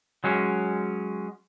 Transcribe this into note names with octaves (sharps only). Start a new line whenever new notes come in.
F#3 G#3 C#4